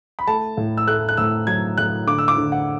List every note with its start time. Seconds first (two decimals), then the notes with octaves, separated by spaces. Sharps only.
0.19 B5
0.27 A3 A5
0.57 A2
0.77 E6
0.87 A3 F#6
1.09 F#6
1.17 A2 E6
1.47 F#3 G#6
1.78 A2 F#6
2.07 D3 D6
2.18 E6
2.28 D6
2.37 D3
2.52 F#5